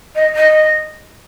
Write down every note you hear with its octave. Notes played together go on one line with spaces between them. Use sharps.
D#5
D#5